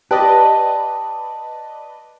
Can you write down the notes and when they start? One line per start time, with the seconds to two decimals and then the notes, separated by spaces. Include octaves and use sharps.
0.11 G4 B4 D5 D#5 A5